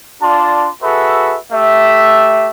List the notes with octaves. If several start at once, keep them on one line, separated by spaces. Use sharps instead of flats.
D4 F4 D5 A5 C6
F#4 G#4 A4 B4 E5
A3 G4 E5